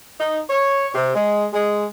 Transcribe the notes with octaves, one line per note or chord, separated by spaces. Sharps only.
D#4
C#5
C3
G#3
G#3